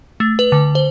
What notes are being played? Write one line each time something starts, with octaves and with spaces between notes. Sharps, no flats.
A3
B4
D3
C5